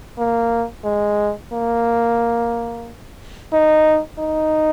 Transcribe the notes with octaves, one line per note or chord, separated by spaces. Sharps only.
A#3
G#3
A#3
D#4
D#4